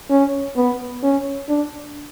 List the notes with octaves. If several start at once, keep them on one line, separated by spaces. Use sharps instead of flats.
C#4
B3
C#4
D4